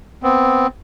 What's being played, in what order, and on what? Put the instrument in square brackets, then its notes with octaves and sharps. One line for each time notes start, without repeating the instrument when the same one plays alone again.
[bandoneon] B3 C4